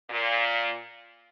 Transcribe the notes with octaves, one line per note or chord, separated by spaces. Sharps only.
A#2